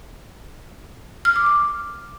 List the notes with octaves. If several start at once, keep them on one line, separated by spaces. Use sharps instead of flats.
F6
D6
D6